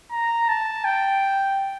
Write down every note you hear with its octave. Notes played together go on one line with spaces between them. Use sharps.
A#5
A5
G5